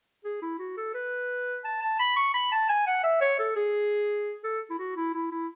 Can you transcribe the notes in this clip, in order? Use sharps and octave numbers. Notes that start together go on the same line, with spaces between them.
G#4
E4
F#4
A4
B4
A5
A5
B5
C#6
B5
A5
G#5
F#5
E5
C#5
A4
G#4
A4
E4
F#4
E4
E4
E4